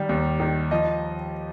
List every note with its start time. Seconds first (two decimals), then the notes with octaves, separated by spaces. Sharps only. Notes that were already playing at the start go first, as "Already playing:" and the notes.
Already playing: D#3 G3
0.09 D#2
0.40 D#3
0.71 F3 D#5